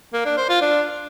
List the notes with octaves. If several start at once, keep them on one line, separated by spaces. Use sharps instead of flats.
A#3
D4
C5
F4
D4